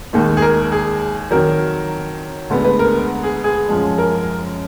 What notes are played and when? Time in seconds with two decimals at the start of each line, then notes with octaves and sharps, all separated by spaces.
0.13 D#2 D#3 G#3
0.37 G#4
0.42 A#4
0.72 G#4
1.31 F2 D#3 F#3 A#4
2.50 D2 D3 G#3 B3
2.65 B4
2.79 A#4
3.23 G#4
3.44 G#4
3.69 F#2 F3 G#3
3.98 A#4